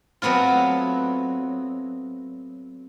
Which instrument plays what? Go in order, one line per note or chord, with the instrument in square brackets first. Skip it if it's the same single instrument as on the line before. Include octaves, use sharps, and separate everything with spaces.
[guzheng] F#3 A3 B3 C4 F4